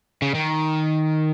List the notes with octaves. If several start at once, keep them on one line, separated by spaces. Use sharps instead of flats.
C#3
D#3